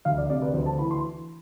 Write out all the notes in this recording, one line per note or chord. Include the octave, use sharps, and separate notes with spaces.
D2 F5
D5
C3 D5
B4
D2 C5
A5
E3 B5
C6